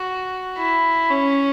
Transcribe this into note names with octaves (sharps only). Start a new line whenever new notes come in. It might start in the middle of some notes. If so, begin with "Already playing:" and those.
Already playing: F#4
E4
C#4